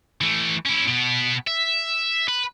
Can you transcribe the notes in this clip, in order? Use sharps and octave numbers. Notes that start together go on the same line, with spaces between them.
E3 A3
C#4 E4
B2 B3
E5
B4